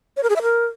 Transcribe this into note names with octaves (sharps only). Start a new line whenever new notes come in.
C#5
A#4
G#4
E5
A#4